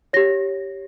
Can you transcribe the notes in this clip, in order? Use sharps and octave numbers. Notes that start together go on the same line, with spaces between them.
G4 C#5 A#6